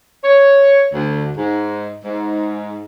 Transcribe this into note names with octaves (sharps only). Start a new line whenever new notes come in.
C#5
D2
G#2
G#2